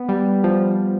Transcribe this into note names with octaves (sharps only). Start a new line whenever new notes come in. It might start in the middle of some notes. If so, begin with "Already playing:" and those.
Already playing: B3
G3
F3